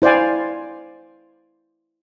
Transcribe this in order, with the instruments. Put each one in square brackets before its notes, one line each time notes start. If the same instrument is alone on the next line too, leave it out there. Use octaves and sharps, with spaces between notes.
[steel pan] E4 C5 D5 F5 G#5